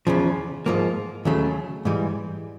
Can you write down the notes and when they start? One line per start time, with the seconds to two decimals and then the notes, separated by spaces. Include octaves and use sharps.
0.07 E2 C#3 F3
0.66 G#2 F3 A#3
1.25 D#2 C#3 F#3 A3
1.85 G#2 E3 G3